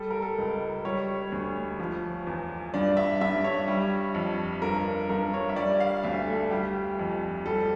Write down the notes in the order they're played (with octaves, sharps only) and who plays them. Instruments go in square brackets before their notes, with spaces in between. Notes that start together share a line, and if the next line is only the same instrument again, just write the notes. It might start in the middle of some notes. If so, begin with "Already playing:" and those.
Already playing: [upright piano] G3 A4
A#4
A4
C#2
G3 C#5
D2
F3
E2
G2 D5
E5
G2 E5
C#5
G3
F2
G2 A#4
G2 A#4
C#5
E5
G3 D5
F5
D2 E5
A4
G3 G4
F2
G3 A4